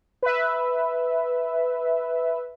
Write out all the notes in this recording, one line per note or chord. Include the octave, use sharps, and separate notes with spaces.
B4 E5